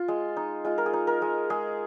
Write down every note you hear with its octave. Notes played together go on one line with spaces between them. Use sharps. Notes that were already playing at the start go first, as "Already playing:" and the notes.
Already playing: F4
G#3
D#4
G#3 F4
A#4
G#4
D#4
A#4
G#3
G#3 G#4